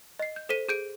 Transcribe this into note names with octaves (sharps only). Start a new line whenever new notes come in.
D#5 C7
G6
A4 C5 B6 D#7
G#4 G6 D7